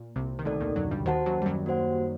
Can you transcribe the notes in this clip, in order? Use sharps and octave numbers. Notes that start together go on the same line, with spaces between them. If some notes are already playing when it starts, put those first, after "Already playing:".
Already playing: A#2
C2 C3
D#3
D2 D3 D#4 A4 D5
D#2 D#3
F#2 F#3
G2 G3
D#2 D#3 F#4 C5 F#5 A5
F#2 F#3
G3
F#2 F#3
A#3 F#4 C5 F#5